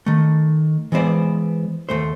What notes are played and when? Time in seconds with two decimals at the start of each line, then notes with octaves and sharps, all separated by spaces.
0.06 D#3 A3
0.92 E3 G#3 B3 C5 D5
1.89 D#2 A#2 A3 C5